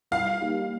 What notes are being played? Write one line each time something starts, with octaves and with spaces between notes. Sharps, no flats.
G3 F5
A#3 D#4 G4